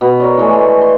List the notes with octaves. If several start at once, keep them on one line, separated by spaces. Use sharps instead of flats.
B2 B5
A#4 C#5 D5
E3 G#3 A3
C6
C6